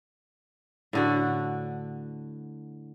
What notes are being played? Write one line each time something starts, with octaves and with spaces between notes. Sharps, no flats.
A2 D3 F#4